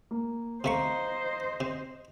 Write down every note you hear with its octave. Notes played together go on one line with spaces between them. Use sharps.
A#3
C3 A3 C5 D#5 F5 A#5 C#6
C3